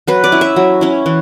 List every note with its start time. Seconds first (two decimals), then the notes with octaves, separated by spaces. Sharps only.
0.08 F#3 B4
0.24 D5
0.32 C#4 E4
0.41 E5
0.56 F#3
0.81 C#4 E4
1.06 E3